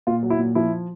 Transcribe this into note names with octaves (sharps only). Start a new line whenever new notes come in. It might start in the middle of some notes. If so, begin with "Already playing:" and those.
A#2 F4
F#3
E4
A#2
F3 E4